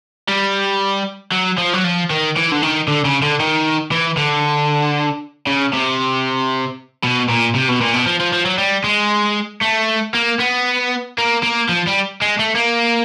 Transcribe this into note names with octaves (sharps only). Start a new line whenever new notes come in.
G3
F#3
F3
F#3
F3
D#3
E3
D3
D#3
D3
C#3
D3
D#3
E3
D3
C#3
C3
B2
A#2
C3
B2
A#2
B2
F3
F3
F3
F#3
G3
G#3
A3
A#3
B3
A#3
A#3
F3
G3
G#3
A3
A#3